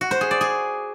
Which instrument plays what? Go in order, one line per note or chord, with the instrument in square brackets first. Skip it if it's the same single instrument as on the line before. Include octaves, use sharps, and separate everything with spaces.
[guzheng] F#4
C5
G#4
D5
G#4